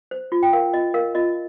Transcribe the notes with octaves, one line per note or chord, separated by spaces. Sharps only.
C5
F4
G5
A#4 F5
F4 D#5
A#4 F5
F4 D#5